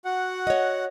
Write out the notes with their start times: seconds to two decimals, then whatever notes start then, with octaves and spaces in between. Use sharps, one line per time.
0.05 F#4 F#5
0.47 C#5 D#5